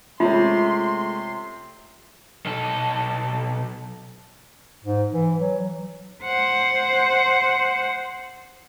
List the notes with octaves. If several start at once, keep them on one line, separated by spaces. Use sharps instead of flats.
C3 G#3 A3 C#4 F4 C6
B1 A4
G#2
E3
F#3
C5 F#5